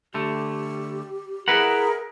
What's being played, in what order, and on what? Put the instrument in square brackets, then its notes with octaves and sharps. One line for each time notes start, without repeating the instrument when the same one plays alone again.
[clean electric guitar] D3 A3 [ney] G4
[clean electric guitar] E4 B4 F#5 [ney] G#4 [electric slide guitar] A#4